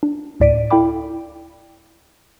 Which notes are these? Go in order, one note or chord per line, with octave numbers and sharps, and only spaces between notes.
D4
D2 A2 D5 B6 D7 D#7
E4 A4 F5 G5 B5 D6